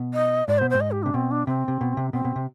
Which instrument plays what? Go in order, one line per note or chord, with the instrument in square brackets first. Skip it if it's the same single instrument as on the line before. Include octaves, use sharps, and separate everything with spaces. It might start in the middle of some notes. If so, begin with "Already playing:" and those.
Already playing: [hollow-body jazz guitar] B2
[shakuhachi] D#5
[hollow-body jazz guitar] G#2 [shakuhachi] D5
[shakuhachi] C5
[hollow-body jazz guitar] B2
[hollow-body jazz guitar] G#2 [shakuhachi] C5
[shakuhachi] D#5
G4
[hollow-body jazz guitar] C3 [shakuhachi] D4
[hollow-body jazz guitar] B2 [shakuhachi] C4
[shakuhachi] D4
[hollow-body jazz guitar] C3 [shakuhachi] C4
[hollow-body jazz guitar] C3
B2
C3
[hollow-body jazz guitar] B2 [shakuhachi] C4
[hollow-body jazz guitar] B2
C3